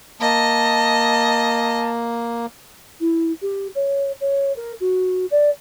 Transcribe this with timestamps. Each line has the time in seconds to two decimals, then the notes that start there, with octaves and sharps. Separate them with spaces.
0.21 A#3 D#5 A5
3.00 E4
3.42 G4
3.75 C#5
4.21 C#5
4.56 A#4
4.80 F#4
5.31 D5